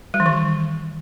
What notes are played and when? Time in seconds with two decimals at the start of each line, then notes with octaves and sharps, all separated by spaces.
0.14 G3
0.20 E3
0.26 D#3